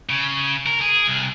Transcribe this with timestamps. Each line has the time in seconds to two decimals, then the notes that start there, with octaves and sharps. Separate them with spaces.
0.09 C#3
0.66 A#4
0.81 G#4
1.07 C2